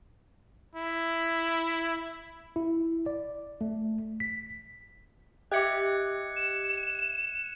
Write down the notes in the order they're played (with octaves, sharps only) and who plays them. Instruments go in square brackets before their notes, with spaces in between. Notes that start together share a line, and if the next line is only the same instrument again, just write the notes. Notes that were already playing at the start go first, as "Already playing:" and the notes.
[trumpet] E4
[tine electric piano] E4
D5
A3
B6
[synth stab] G4 [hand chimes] D#5 E5 D6 [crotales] F#6 G#6 C#7
[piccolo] E7